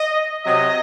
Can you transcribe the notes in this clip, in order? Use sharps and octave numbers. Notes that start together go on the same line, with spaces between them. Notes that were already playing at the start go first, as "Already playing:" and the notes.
Already playing: D#5
C3 F#3 D#5